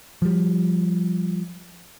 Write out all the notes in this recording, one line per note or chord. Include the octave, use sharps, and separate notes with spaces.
F3 G3